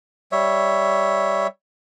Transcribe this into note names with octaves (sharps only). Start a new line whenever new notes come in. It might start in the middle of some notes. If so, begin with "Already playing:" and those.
G3 C#5 E5